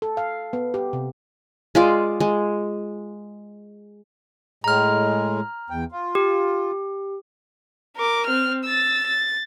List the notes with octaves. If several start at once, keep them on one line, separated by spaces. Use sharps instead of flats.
A4
F5
B3
G4
C3
G#3 F4 D5
G#3
A2 G#3 A#5 F6
E2 G5
F4
G4
A#4 D6
C4 F6
E6 A6
A6